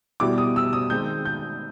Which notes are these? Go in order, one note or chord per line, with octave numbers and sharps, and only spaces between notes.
B2 G3 B3 E4 D6
D#6
E6
D#6
D#3 G#3 C4 G6
G6